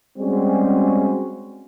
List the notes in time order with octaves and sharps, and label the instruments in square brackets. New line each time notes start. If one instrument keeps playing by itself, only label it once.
[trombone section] G3 G#3 C4 C#4 F#4 G#4